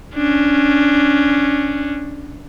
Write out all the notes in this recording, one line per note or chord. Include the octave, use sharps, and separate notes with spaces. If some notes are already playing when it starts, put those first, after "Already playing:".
C#4 D4